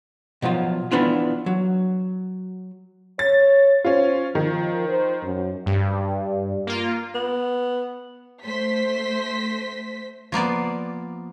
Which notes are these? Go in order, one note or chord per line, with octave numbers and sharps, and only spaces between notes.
B2 F3 F#3 F4
E3 B3 D4 F4
F#3
C#5 A6
C#4 F4 C5
D#3 F3
C5
F#2
G2
A#3 F4
B3
A3 C5 B6
F3 A#3 B3 D5